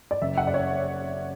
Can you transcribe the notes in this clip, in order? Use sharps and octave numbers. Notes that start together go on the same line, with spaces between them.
D5
F#1 E5
F#5
D5
C#5